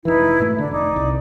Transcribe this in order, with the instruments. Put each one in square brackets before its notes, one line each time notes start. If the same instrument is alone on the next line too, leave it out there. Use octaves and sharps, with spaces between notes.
[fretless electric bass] F1 C2 E3 [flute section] D#4 E4 B4
[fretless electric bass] G#2 B2 A3
[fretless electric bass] D3 [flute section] D4
[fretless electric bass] F1 [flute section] D#4 D5 D6
[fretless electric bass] C2